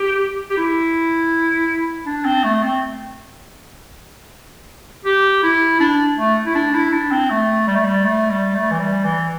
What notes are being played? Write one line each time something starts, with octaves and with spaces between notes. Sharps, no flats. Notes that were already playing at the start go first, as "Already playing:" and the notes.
Already playing: G4
G4
E4
D4
C4
A3
C4
G4
E4
D4
A3
E4
D4
E4
D4
C4
A3
G3
A3
G3
A3
G3
A3
E3
G3
E3